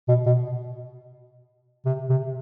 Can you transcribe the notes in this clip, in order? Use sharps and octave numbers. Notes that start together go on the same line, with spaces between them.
B2
B2
C3
C3